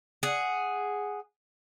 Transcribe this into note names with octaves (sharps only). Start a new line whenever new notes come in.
G#4 F#5